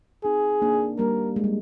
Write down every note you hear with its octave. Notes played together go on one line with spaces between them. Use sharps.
C4 D#4 G#4
A#3 D4
G3 A#3 A#4
G#3
G3